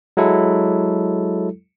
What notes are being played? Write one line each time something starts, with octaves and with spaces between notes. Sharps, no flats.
F#3 G#3 E4 A4